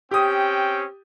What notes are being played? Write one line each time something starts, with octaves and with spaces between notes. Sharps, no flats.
C4 C#4 G4 G5 D#6